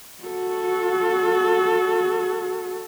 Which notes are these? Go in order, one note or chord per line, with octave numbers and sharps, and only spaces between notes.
F#4 A4